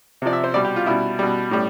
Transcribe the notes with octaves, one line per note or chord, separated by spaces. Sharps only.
C3 F3 D5
E5
C5
B2 G3 D5
G4
F4
B2 G3 E4
B2 G3
A2 G3